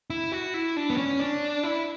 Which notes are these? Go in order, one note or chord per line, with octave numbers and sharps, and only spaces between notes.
E4
F#4
E4
D4
B3
C#4
D4
E4